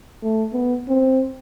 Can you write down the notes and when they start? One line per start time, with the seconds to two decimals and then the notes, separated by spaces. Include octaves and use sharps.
0.23 A3
0.53 B3
0.88 C4